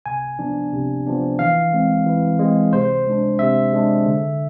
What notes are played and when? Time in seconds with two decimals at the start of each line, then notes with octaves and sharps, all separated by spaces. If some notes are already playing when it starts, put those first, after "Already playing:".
0.06 C3 G#5
0.39 F3 B3 D4
0.73 C3
1.07 F3 B3 D4
1.39 E3 F5
1.73 G#3 C4
2.06 E3
2.39 G#3 C4
2.73 C3 C5
3.07 G#3 D4
3.39 C3 E5
3.73 G#3 D4
4.06 D3